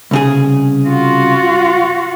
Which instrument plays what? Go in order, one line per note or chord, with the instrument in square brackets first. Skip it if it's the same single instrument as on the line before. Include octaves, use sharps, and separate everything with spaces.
[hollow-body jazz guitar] C2 C#3 G#4
[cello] F4 F#4